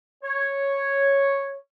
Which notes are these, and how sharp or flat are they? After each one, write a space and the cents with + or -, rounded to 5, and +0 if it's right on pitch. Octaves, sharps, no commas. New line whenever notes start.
C#5 -5